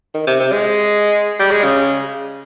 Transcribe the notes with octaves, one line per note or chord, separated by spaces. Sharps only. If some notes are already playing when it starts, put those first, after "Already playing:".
D#3
C3
C3
G#3
G3
G#3
C#3